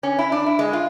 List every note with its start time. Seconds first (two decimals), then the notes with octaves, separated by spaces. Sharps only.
0.03 C#4
0.19 E4
0.32 D4
0.46 E4
0.59 G#3
0.73 F4